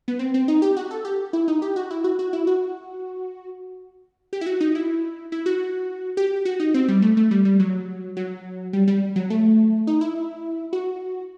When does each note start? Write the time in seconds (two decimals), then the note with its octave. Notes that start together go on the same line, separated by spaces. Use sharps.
0.08 B3
0.19 C4
0.34 C4
0.48 D#4
0.62 G4
0.77 F#4
0.91 A4
1.05 G4
1.33 E4
1.48 D#4
1.62 G4
1.76 F#4
1.91 E4
2.04 F#4
2.19 F#4
2.33 E4
2.47 F#4
4.33 G4
4.41 E4
4.46 F#4
4.61 D#4
4.75 E4
5.32 E4
5.46 F#4
6.17 G4
6.45 F#4
6.60 D#4
6.74 C4
6.88 G3
7.02 A3
7.17 A3
7.31 G3
7.45 G3
7.60 F#3
8.17 F#3
8.73 G3
8.87 G3
9.16 F#3
9.30 A3
9.87 D#4
10.01 E4
10.73 F#4